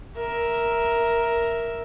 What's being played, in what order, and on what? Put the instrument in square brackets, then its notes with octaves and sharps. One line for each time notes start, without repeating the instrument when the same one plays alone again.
[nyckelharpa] A#4 E5